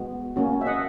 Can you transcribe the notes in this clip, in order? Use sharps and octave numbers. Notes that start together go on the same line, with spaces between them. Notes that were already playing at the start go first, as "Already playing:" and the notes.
Already playing: G#3 B3 F#4
A#3 C#4 F#4
E5
D#5 F#5